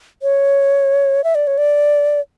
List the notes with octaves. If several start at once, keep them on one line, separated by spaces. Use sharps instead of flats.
C#5
E5
D5
C#5
D5